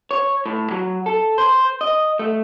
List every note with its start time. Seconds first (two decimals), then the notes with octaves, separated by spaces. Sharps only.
0.11 C#5
0.46 A2
0.71 F#3
1.06 A4
1.38 C5
1.81 D#5
2.19 A3